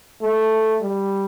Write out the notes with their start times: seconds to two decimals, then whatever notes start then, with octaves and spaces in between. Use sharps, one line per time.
0.22 A3
0.82 G3